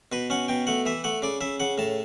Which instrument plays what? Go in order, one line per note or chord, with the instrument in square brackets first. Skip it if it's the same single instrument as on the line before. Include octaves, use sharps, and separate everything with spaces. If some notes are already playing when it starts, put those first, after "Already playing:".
[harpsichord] B2 B4
C#4 F#5
B2 G5
A3 F#5
E3 E5
A3 F#5
C#3 D5
C#3 E5
C#3 F#5
A2 A5